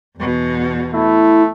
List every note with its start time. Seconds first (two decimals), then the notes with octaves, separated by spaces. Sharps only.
0.18 E2 B2
0.94 A3 E4